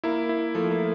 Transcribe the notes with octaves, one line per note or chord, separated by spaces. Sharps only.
A#3 E4
E4
F3 A3
A#3